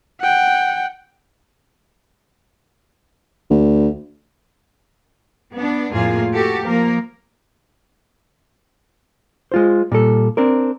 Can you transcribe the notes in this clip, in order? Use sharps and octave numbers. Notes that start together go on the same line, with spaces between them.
F#5 G5
D2
B3 D4
F2 A2 A#3 F4 G#4
F#4 G4 A4
F3 A#3 A#4
G#3 F4 C5
A#2 G3 A4
C4 D4 A#4